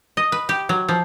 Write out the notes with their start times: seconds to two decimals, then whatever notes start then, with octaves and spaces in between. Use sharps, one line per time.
0.17 D#5
0.32 B4
0.49 G4
0.69 F#3
0.89 F3